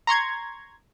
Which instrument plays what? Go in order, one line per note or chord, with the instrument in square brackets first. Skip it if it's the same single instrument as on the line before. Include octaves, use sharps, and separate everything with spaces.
[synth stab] A#5 C6 C#6 G#6